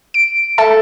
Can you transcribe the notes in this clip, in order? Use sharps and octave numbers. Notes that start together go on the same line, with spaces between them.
D7
A4 E5 A5